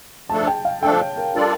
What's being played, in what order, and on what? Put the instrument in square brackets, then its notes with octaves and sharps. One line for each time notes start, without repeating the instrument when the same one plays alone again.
[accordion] F3 A3 D4 A4 [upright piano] A5
[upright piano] A5
G5
F5
[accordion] F3 A3 D4 A4 [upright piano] G5
[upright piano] C#5
A#4
[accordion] G3 D4 F4 A4 D5 [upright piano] A#4